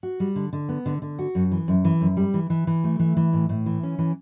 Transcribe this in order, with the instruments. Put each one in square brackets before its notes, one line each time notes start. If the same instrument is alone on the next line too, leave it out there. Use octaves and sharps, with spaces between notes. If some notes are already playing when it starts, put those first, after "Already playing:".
[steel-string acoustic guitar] F#4
G3
D3
D3
B3
D3
D3
F#4
F#2
E3
F#2
E3
F#2
G3
E3
E3
E3
A3
E3
E3
A2
A2
E3
C#4
E3